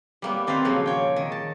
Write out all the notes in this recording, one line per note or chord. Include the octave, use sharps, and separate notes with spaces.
G3 A#3 B3
D#3 C4 A4 B4 F5
A#2 C#3 F3 F#3 A#3
C#5 G5
D#3
A5